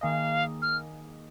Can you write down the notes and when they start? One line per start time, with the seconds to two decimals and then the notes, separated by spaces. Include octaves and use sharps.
0.01 D#3 A#3 G#4 D#5 F5
0.62 F6